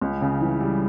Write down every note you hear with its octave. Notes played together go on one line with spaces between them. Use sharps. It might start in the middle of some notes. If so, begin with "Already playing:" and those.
C#2
C#3
E3
G3